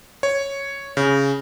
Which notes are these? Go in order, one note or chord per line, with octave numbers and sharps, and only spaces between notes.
C#5
C#3